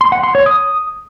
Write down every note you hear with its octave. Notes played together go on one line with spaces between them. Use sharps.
C6
F#5
C6
C#5
D#6